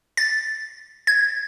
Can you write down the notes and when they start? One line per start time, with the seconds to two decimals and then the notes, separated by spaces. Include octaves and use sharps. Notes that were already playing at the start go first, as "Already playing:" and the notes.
0.17 A6
1.07 G#6